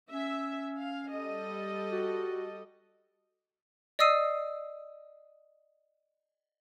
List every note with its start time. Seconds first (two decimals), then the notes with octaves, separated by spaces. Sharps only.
0.11 C#4 E5
0.79 F5
1.10 G3 A4 D#5
1.92 F#4
3.99 D5 D#5 D#6 E6 C7 D#7